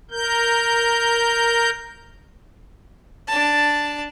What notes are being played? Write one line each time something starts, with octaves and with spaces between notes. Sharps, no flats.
A#4 G6
D4 A5